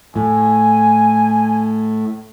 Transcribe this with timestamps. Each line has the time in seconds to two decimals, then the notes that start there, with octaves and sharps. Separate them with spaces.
0.16 A2 G#5